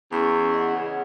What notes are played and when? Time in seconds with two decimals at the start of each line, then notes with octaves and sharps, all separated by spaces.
0.12 E2 C#4 C#6
0.54 D#5 F#5
0.75 C#3